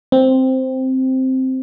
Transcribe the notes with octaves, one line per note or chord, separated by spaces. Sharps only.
C4